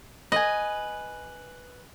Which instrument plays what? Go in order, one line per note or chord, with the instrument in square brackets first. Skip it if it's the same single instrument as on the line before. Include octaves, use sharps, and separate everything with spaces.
[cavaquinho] B4 G#5 [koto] D#5